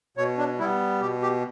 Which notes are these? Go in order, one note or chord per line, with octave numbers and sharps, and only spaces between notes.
B2 C#5
D4
G3 B3 E4
B2 G4
G4